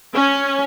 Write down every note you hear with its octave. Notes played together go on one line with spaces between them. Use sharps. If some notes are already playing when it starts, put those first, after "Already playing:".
C#4